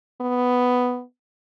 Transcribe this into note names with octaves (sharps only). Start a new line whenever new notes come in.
B3